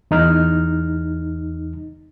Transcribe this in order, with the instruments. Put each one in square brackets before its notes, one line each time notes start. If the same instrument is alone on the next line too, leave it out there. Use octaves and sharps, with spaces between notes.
[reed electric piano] E2 D#4 F6